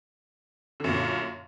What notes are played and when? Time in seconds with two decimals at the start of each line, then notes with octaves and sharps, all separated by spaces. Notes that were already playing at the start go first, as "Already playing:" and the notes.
0.80 D3
0.84 F#2
0.89 A#2